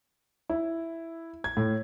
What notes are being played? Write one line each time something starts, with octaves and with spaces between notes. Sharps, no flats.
E4
G#6
A2